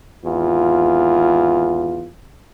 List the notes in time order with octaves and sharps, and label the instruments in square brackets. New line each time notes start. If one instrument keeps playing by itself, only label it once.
[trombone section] G#1 E2 F4